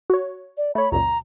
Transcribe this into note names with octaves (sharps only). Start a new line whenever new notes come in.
F#4 C#5
D5
A3 C#5 B5
C#2 F#2 A#2 A#5